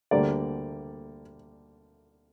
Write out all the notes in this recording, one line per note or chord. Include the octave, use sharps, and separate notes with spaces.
D2 D3 G3 A#3 D5